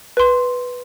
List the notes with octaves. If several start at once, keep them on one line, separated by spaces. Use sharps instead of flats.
B4 C6